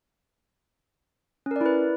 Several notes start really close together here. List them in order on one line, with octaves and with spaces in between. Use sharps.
C#4 A#4 D5 E4 B4